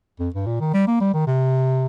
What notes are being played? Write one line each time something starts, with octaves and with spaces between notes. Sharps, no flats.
F2
G2
A#2
D#3
G3
A#3
G3
D#3
C3